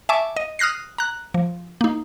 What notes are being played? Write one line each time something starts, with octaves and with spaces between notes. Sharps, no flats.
E5 G#5 A5 C#6 D6
D#5
D#6 F6 F#6 A#6 C7
A#5 F#6
F3
A#3 D#4